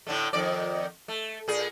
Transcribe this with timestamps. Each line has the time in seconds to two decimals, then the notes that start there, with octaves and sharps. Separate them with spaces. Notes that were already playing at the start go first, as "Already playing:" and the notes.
0.07 A2 D3 A3
0.33 F2 D#3 D5
1.08 A3
1.48 A#2 G#4